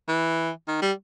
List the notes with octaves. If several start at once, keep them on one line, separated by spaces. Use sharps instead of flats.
E3
D#3
G3